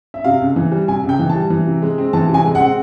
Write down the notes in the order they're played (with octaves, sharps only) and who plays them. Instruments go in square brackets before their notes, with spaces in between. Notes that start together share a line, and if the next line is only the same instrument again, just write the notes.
[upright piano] E5
C3 F5
C#2
E3
G3
C3 G#5
C#2
G5
E3
A5
G3
E3
C3
G#3
C4
E3 A5
C3
G#5
G#3
C4 F#5